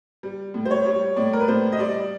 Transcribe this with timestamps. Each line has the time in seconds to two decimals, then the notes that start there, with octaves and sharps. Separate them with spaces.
0.23 G3
0.54 A2
0.65 C5
0.71 C#5
0.86 G3
1.16 A2 D5
1.33 A#4
1.41 B4
1.48 A2 C5
1.72 D#5
1.79 G3 D5